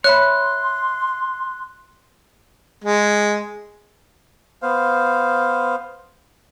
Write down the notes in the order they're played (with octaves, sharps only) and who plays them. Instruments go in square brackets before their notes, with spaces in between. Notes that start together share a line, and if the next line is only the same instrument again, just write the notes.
[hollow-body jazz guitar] C#5 E5 B5 [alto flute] C6 [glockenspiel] F#6
[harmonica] G#3
[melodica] B3 C5 F5